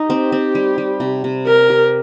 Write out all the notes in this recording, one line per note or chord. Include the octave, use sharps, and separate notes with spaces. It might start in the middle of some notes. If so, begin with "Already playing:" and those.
Already playing: D#4
C4 G4
C4
G3
G3
C3
C3
G4 A#4
G4